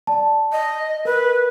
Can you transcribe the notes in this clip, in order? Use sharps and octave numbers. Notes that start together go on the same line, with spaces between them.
D5 A5
D#5
A#4 B4